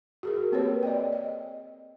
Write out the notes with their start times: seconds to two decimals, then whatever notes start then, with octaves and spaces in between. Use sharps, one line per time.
0.23 F#4 G#4 A#4
0.52 A#3 C4 G4 A#4 B4 C#5
0.83 D5 D#5 G5
1.13 D#5